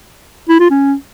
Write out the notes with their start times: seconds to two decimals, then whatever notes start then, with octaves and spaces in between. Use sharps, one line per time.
0.49 E4
0.60 F4
0.71 C#4